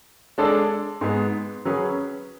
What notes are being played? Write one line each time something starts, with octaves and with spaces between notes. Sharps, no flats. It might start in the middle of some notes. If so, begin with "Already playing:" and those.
G#3 D4 A4 D5
G#2 G#3 B3
F#3 C#4 G#4 B4